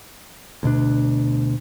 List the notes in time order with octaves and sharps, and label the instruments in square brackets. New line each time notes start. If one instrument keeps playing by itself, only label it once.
[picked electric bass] D2 B2 D4